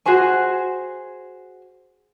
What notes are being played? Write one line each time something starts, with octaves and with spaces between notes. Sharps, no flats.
F#4 G#4 C5 G#5